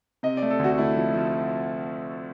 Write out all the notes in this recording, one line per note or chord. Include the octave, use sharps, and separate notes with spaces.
C3 D#5
D5
A3
A4
D2 F#4
A3 E4
F3
F3